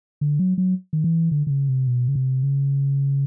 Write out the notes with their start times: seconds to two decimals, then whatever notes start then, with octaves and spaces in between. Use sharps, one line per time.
0.21 D3
0.39 F#3
0.58 F#3
0.93 D#3
1.04 E3
1.31 D3
1.47 D3
1.50 C#3
1.69 C3
1.87 B2
2.08 C#3
2.15 C3
2.43 C#3